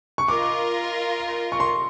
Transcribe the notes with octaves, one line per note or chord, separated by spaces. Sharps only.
C#6
F4 A#4 D#5 D6
C#6
C6